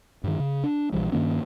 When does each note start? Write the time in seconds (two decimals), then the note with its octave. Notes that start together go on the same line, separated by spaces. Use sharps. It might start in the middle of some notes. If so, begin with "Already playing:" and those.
0.24 G2 D#3
0.40 C#3
0.64 D4
0.92 A#1 E2 E3 G3
1.12 G2 D#3 A#3 C#4